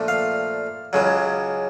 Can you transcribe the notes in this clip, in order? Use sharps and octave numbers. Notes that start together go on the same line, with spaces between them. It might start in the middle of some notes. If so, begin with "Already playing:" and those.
Already playing: A#2 F3 A3 D4
F5
C#2 C#3 F#3